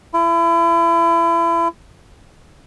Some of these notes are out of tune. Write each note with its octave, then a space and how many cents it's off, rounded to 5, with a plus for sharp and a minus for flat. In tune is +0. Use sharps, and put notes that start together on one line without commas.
E4 +35